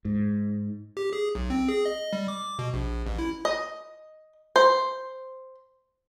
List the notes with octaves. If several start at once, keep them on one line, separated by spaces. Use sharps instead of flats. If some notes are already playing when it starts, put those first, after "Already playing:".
G#2
G4
G#4
B1
C4
G#4
D#5
G3
D6
B2
A#1
A1
E4
D#5
C5